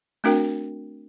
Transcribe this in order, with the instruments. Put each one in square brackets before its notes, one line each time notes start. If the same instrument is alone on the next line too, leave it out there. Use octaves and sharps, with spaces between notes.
[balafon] A3 C4 D4 F#4 A#4 G5